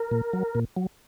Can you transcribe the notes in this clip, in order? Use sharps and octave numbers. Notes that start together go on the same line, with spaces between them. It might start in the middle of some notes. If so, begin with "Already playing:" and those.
Already playing: A#4
A#2
F#3
A#2
F#3